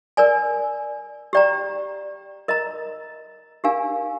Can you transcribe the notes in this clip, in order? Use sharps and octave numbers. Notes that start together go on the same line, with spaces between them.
A#4 D5 G#5
G4 D5 G5 A#5
A#4 D#5 A#5
D4 G4 A#4 F5 G#5